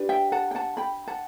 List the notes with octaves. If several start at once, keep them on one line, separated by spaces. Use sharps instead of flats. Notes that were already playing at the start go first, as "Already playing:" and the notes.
Already playing: D4 G4 B4
E5 G5
F#5 A5
G5
F#5 A5
G5 B5
F#5 A5